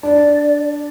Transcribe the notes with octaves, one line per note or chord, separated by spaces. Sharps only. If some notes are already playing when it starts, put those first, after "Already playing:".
D4 D5